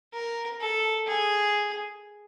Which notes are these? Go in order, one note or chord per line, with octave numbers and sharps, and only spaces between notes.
A#4
A4
G#4